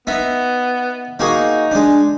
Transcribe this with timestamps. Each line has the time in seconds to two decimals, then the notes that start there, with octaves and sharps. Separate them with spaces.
0.07 B3 D#4 E5
1.19 A#3 D#4 F#4 G#4
1.71 G#3 D4